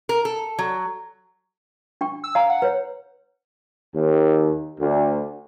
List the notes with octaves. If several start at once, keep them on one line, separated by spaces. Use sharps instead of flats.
A#4
A4
F#3
D4 G5 C#6
E6
D5 F5 G#5 A#5
F#5
B4 C#5
D#2
D2